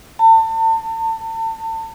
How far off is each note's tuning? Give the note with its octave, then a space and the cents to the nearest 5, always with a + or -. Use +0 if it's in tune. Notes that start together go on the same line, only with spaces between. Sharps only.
A5 +35